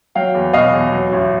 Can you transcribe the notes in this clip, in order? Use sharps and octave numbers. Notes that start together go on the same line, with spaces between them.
F#3 F5 G5
E2
B2 D#5 F5
E2
F#3
A1